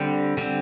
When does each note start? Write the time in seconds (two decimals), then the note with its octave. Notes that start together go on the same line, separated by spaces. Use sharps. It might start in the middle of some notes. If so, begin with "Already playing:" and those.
Already playing: D3 G3 C4
0.37 D3 G3 C4